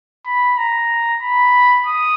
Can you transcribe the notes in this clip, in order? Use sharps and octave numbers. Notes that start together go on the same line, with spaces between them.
B5
A#5
B5
D#6